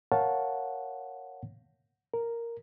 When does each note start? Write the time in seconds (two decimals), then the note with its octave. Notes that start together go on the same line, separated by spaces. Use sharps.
0.12 A#4 C#5 F5 F#5 A5
2.13 A#4